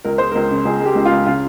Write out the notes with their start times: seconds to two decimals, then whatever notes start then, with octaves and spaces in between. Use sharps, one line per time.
0.05 C#2 A#4
0.18 G#3 C5
0.31 C#2 A#4
0.50 C#3
0.65 C#2 G#4
0.80 G#3
0.85 G4
0.95 C#2
1.06 F4
1.11 C#2
1.26 C#3 F4